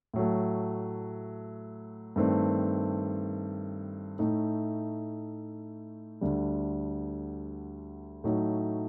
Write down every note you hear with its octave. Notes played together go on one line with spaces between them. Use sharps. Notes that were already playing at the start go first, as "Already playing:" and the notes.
A2 F#3 A3
G2 D#3 A3 C4
A2 A3 D#4
D2 D3 G3
A2 F#3 A3 D#4